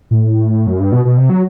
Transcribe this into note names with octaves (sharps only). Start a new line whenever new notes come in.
A2
F#2
G2
B2
B2
C3
F#3